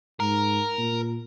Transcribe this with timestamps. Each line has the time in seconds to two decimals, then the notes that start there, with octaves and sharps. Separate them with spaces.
0.20 G#2 A#4
0.78 A#2